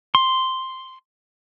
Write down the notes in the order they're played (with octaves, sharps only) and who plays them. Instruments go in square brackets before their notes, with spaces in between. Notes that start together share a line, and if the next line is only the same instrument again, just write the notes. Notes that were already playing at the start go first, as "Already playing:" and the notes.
[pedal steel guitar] C6